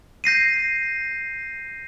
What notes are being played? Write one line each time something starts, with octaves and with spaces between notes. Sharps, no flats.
G6 A#6 C7 D#7